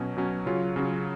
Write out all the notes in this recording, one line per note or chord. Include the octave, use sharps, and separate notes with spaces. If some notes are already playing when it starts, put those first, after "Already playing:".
Already playing: B2 F#3 C#4
B2 F#3 C#4
C#3 F#3 C#4 F4
C#3 F#3 C#4 F4